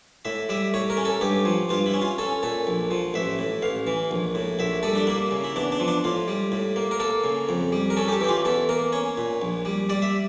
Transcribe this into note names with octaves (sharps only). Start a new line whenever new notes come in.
A2 E5
G3 E5
A2 C#5
A#4
C#4
A4
G2 G4
F3
G2 F4
E4
C#4
F4
C#4 A4
A#2 A4
A#1
F3
A1 E5
A2
A1 F5
E3
A#1
A2
A#1 E5
G3 A4
D4
A#3 E4
C#3
E4
E2 D4
D4
F3
D4
A2 F4
G3
A2
A#3
A#4
A#3 A4
C#3
F2
G3
A#4
C#4 A4
G4
A4
E3 G4
F4
E2 A4
A#3 A#4
C#4 C#5
A#2
A#1
G3
G3 D5
E5